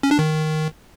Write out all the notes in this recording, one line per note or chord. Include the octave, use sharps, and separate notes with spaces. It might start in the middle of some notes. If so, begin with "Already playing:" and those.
C#4
D4
D#3